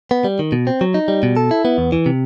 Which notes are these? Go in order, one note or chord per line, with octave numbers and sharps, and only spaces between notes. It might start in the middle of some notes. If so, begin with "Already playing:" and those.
B3
G3
D#3
B2
C4
F#3
D#4
G3
B2
A4
E4
B3
E2
E3
C3